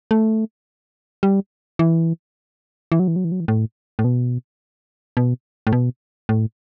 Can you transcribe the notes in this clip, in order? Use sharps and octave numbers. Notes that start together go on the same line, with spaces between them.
A3
G3
E3
E3
F#3
E3
F#3
E3
F#3
E3
A2
A2
B2
B2
A2
B2
A2